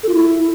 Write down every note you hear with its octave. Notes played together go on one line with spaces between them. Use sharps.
A4
F4
E4